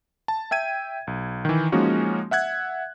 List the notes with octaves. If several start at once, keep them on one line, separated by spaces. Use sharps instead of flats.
A5
E5 G5 G#6 D#7
B1
D#3 E3
F3 G#3 A#3 C#4 D#4 F#4
E5 F#5 F#6 G#6